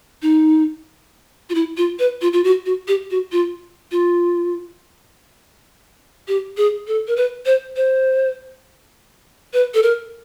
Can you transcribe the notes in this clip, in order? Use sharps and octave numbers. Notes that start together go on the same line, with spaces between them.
D#4
F4
E4
F4
B4
F4
F4
F#4
F#4
G4
F#4
F4
F4
G4
G#4
A4
A#4
B4
C5
C5
B4
A4
A#4